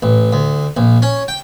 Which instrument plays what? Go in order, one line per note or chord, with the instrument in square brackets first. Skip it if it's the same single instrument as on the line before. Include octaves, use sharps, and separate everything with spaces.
[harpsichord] A1
D2
A#1
C#4
G5